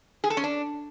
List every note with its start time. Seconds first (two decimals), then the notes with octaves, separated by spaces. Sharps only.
0.24 G#4
0.30 A4
0.37 C#4
0.44 D4